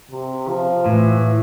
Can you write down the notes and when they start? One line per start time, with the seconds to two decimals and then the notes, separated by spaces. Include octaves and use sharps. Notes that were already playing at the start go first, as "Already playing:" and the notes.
0.11 C3
0.48 F3
0.86 A2 E3